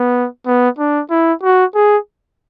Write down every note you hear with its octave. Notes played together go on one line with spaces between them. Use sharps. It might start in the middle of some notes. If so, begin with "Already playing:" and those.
Already playing: B3
B3
D4
E4
F#4
G#4